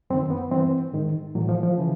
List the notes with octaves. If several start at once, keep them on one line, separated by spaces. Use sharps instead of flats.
F#2 D#3 C4
B3
G2 E3 C4
G#2 D#3
A2 E3 F#3
F3
F3
C#3 E3